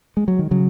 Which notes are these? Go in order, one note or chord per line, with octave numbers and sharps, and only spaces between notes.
G#3
F#3
D#3
C#3 F#3